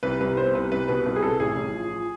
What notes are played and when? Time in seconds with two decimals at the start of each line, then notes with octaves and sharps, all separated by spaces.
0.03 C2 B4
0.20 C2 B4
0.37 B3 C5
0.55 C2 B4
0.72 C2 B4
0.88 B2 B4
1.06 C2 B4
1.16 G#4
1.23 C2 A4
1.40 A1 G#4
1.57 A1
1.74 F3
1.91 F3